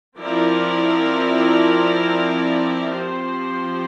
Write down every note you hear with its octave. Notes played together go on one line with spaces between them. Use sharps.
F3 C4 E4 A#4 D5
F3 C4 G4 C5